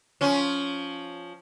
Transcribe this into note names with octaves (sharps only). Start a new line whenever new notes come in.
F3 C#4